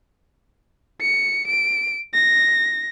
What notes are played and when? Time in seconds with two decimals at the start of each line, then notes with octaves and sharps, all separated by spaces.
1.01 C#7
1.48 D7
2.14 A#6